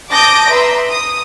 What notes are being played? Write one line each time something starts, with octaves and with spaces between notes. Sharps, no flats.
A5 D6 D#6 G6 A#6 D7
B4 E5 A#5 C6
D#6